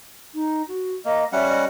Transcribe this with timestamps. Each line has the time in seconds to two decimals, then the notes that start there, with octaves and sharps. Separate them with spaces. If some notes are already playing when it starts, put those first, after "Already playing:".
0.34 D#4
0.68 F#4
1.05 A#3 D#5
1.32 G3 C#4 E5 F#5
1.48 D#5